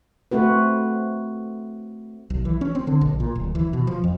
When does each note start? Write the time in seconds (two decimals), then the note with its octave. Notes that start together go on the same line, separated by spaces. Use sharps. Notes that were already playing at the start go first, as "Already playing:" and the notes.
0.31 A3 C4 F#4 B4
2.30 B1
2.45 E3
2.61 C#4
2.75 C4
2.87 D3
3.01 A#1
3.20 A#2
3.35 D1
3.55 E3
3.73 B2
3.87 F3
4.04 F2